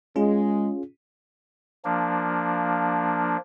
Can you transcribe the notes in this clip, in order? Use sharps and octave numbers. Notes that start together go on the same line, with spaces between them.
G#3 C#4 F4 G#4
F3 A#3 D4